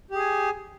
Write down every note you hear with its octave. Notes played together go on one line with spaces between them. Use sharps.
G4 G#4 G#5